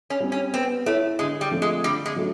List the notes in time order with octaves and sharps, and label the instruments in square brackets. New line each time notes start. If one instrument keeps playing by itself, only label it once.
[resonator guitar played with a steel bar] C#4
[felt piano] G3 C4
[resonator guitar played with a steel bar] C#4
[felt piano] B3 [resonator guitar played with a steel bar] C4
[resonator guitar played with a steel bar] A3 [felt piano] E4 A4 C#5
[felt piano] D3 [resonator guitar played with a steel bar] G#3
[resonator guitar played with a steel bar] G3
[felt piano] F3 A3 C4
[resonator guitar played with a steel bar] G#3
[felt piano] D3 [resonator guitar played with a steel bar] G3
[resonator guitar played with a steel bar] G#3
[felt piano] F#3 A3